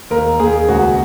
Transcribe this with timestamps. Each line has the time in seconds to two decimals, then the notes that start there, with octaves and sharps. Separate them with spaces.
0.10 D#2 A#4
0.40 D#2 G#4
0.68 C#2 F#4